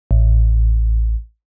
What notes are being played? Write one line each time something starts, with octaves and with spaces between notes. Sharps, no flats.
A1